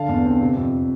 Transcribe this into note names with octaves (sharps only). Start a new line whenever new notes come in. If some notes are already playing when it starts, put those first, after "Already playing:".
Already playing: D3 F5 A5
E2
C4
C3
F2